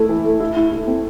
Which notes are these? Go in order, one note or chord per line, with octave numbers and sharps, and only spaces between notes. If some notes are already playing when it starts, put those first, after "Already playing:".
Already playing: A3 E4
E3
A3
E4
E4
E4
C4